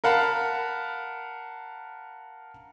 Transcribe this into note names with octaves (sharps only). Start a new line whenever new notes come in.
A#4 F5 F#5 A5 B5